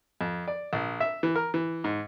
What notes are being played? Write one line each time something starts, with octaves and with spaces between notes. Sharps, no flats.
F2
D5
A#1
E5
E3
A#4
E3
G#2